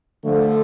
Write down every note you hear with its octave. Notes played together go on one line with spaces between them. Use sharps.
D3 F3 A3